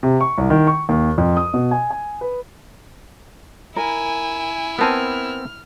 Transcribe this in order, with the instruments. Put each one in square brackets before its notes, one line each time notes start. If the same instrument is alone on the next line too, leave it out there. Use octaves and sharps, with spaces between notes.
[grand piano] C3
C#6
C2
D#3
C#6
D#2
F2
D#6
B2
G#5
G#5
B4
[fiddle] E4 [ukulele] A#4 [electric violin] G#5
[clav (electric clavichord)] B3 C4 G#5 [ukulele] A#4 A5 [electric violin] F6